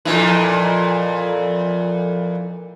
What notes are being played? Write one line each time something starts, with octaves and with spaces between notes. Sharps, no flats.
F2 A#2 E3